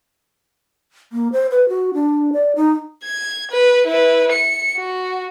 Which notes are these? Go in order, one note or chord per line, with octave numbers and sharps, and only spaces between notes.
A#3
C5
B4
F#4
D4
D5
D#4
G#6
B4
E4 B4
C#7
F#4